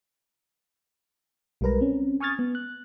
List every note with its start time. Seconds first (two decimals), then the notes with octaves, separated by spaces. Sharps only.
1.61 B1 G3 G#3 A#4 B4 A#5
1.81 C4 C#4
2.20 G#5 C#6 D#6 F6 G#6 A6
2.39 B3
2.55 F#6